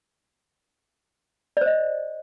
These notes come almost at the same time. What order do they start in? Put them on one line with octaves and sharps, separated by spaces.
D5 C5 D#5